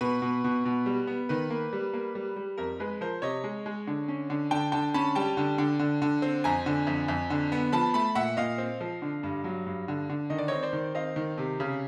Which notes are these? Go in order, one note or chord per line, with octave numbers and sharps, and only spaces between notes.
B2 B4
B2
B2
B2
G3
B3
D#3 B4
A#3
G3
A#3
G3
G3
F2 A#4
G#3 B4
F3 A#4 C5
C3 C#5 D#5
G#3
G#3
D3
C#4
D3
D3 G5 A5
D3 G5 A5
C#4 A5 B5
G3 G5 A5
D3
D3
D3
D3
C4
F2 G#5 A#5
D3
F2
F2
D3
B3
F3 A5 B5
A3 A5 B5
A#2 E5 F#5
A#2 D#5 F5
C4
F3
D3
G2
F#3
G2
D3
D3
D#3 D#5
D5
C4 C#5 D#5
C5 D5
D#3
C4 D#5 F5
D#3
C3
C#3